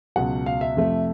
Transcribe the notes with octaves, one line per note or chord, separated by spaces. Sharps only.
C#2 B2 F#3 F#5
F5
E5
F2 C3 F3 A3